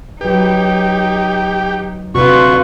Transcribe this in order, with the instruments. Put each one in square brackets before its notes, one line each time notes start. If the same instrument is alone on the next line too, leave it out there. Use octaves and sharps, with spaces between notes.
[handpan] F#3 B4 [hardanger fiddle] D#4 [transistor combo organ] G4
[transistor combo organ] D2 [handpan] C3 F#4 [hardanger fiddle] F4 B4 [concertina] C#6